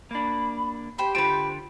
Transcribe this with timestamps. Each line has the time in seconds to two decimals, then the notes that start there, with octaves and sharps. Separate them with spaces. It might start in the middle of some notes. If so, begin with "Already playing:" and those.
0.11 A#3 D4 B5
0.98 G4 C5 G5 B5
1.15 D3 F4 B4 C5 G5